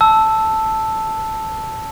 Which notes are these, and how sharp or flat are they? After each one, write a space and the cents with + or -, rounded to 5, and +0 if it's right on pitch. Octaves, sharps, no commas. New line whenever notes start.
A5 +0 E6 +0